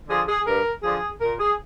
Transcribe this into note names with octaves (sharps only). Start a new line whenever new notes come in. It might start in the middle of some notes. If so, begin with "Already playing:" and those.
D3 F3 G#4
G#4
G2 A#4
D3 F3 G#4
A#2 A#4
G#4